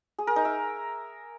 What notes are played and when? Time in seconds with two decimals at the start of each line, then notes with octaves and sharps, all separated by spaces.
0.19 G#4
0.27 A#4
0.36 D#4
0.45 E5